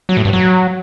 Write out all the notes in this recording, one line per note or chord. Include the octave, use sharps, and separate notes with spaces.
F#3
A2
G2
F#3